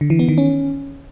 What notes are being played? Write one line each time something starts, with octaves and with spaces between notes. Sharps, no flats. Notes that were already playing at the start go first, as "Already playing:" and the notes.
D3
E3
B3
D#3
C#4